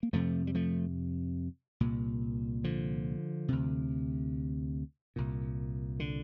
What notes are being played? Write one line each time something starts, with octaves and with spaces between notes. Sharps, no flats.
A#3
F2 C3 F3 A3
G3
F3 A3
C2 A#2
D3 F3
D2 C3
C2 A#2
D3